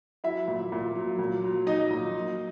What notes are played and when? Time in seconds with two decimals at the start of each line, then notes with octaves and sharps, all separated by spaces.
0.24 F#3 E4 E5
0.48 A#2
0.72 A#2
0.95 F#3
1.19 A#2
1.44 F#3
1.67 F#3 D#4 D#5
1.90 A#2
2.15 F#3